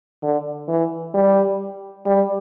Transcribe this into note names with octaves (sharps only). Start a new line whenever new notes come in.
D3
E3
G3
G3